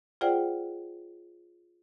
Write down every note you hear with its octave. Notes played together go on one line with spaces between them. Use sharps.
F4 G#4 C5 D5 F#5 G5